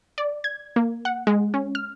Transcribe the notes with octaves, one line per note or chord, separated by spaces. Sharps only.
D5
G#6
A#3
F#5
G#3
C#4
F6